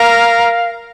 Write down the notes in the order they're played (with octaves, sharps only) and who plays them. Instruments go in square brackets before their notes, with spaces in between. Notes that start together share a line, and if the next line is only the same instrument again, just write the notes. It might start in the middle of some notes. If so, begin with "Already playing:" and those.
Already playing: [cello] A#4 [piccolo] F5